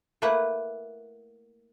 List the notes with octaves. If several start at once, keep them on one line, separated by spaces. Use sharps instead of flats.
A3 A#3 E4 B4 F#5